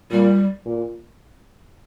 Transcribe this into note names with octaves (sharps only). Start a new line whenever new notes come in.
A#2 G3
A#2